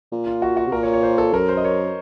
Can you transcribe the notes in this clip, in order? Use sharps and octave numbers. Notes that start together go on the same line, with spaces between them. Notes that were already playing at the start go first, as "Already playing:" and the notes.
A#2
F4
F#4
F#4
C3
A#2 A#4
C#5
C#5
C5
A4
F#2 A#4
C5
D#5
C#5